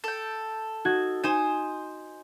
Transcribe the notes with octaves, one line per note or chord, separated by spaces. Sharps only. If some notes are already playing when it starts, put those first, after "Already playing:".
A4 G5
D#4 F#4 G#6
D#4 C5 G#5 E7